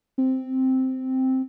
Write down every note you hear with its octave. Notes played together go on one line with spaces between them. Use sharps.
C4